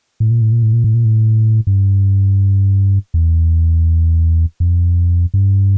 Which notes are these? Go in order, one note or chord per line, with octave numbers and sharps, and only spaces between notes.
A2
A#2
A2
A#2
A2
A#2
A2
A#2
A2
G2
E2
F2
G2